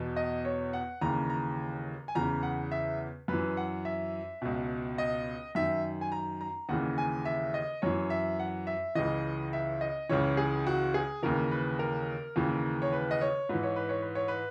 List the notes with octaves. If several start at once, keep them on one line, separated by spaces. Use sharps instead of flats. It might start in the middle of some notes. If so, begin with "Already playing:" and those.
Already playing: E2 B2
D#5
C#5
F#5
D#2 C#3 E3 A#5
A#5
G#5
E2 C#3 E3 A#5
F#5
E5
F#2 E3 B4
F#5
E5
C#2 B2
D#5
F#2 D#3 E5
G#5
A#5
A#5
D#2 C#3 E3 F#5
G#5
E5
D#5
F#2 E3 C#5
E5
F#5
E5
C#2 C#3 E3 D#5
E5
D#5
C#2 C#3 E3 C#5
G#4
F#4
G#4
D#2 C#3 E3 A#4
B4
A#4
D#2 C#3 E3
C#5
B4
D#5
C#5
G#2 E3 B4
C#5
B4
C#5
B4
C#5
B4